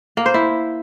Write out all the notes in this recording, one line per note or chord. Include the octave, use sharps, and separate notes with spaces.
A#3
C5
E4